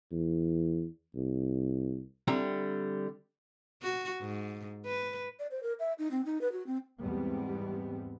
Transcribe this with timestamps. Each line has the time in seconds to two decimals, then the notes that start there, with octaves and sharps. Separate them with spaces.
0.12 E2
1.15 C2
2.28 D3 G3 C4 E4 A#5
3.83 F#4
4.21 G#2
4.86 B4
5.39 D5
5.51 C5
5.63 A#4
5.80 E5
5.99 D#4
6.11 C4
6.25 D#4
6.41 B4
6.52 F#4
6.67 C4
7.01 E2 G#2 G3 G#3 B3 C4